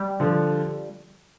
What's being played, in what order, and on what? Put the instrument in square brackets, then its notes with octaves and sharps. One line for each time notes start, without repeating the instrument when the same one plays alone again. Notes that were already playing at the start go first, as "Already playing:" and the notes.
Already playing: [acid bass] G3
[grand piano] D3 F3